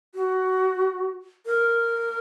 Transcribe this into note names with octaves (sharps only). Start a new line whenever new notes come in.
F#4
A#4